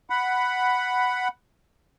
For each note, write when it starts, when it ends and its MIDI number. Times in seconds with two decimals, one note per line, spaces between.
0.10 1.28 78
0.10 1.28 83